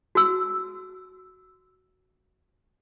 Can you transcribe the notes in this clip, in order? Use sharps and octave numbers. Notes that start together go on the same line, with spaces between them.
F#4 E6